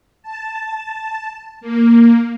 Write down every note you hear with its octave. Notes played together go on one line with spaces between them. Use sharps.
A5
A#3